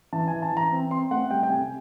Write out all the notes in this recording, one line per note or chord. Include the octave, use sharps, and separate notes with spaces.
E3 A5
E3 G#5
A5
E3 A#5
C4
C4 C6
A3 F#5
G3 G5
G5
C3 G#5